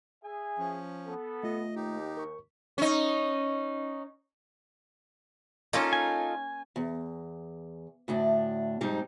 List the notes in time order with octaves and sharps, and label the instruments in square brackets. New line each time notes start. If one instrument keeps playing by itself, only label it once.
[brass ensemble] G#4 E5 G#5
[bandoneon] F3 C#4
[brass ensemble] B3 A4
[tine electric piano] A3 F4 [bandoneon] D#5
[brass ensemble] D#2 [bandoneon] D#4 G4
[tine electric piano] A#4 C#6
[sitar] C#4 D#4
[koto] A#3 C#4 [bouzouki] D#4 F4 A4
[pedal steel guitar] G#5
[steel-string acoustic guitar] E2
D2 A2 D4
F2 G#2 G3 D#4